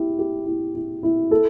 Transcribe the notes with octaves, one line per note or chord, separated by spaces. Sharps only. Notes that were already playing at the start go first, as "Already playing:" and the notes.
Already playing: E4 G4
G4
E4
E4
E4
A4